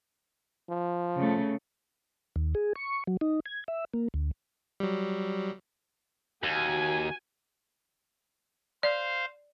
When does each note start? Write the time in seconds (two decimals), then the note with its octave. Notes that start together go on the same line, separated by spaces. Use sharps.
0.69 F3
1.16 C#3 A3
2.36 D#2
2.55 G#4
2.76 C#6
3.07 F#3
3.21 D#4
3.46 G#6
3.68 E5
3.94 A#3
4.14 D2
4.80 F#3 G3
6.43 D#2 F#4 G#5
8.83 C5 D5 F5